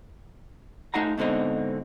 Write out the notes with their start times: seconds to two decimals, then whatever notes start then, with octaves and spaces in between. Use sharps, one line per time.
0.94 A3 D#4 F5 F#5 A#5
1.18 G#2 B2 D3 C4 D#4